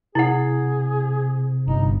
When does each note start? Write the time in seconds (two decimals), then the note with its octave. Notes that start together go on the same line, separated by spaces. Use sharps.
0.15 C3 E4 G#4 F#5
1.67 G1 D#4